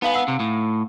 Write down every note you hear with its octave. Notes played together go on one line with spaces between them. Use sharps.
B3 D#4 B4 F5 G#5
F#5 E6
C3
A2